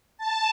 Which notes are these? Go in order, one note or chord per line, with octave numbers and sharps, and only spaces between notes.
A5